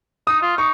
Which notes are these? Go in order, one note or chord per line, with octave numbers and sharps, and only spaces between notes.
D#4 D#6
F4
D#4 C#6